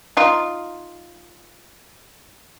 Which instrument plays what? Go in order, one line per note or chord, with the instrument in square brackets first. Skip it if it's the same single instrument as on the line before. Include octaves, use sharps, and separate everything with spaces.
[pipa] D#4 F4